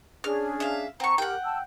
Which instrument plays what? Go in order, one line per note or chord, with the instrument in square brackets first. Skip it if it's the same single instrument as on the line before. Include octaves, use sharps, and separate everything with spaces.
[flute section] C#4 D4 G#4 [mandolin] F6
[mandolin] E5 F5
[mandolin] C4 C#6 [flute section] F#5 A#5
[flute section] G4 A#4 [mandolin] F#5 G5
[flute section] A5 E6